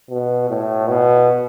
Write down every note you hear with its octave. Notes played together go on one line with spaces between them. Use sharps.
B2
A2
B2